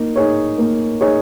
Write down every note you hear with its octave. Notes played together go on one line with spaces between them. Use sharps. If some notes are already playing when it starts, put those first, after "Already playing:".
Already playing: A#3 D#4
D#4 G#4 C#5
A#3
D#4 G#4 C#5